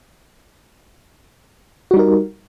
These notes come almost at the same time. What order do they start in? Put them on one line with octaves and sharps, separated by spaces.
F#4 G3 D#4 A#4